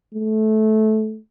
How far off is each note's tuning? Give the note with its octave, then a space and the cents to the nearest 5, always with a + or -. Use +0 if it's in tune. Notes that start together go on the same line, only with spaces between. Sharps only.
A3 -20